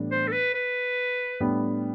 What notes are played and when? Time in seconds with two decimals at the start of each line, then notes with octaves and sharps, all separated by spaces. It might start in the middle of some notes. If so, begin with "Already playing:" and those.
Already playing: A2 E3 G3 B3 D4
0.11 C5
0.28 A4
0.32 B4
0.54 B4
1.40 A2 G3 B3 D4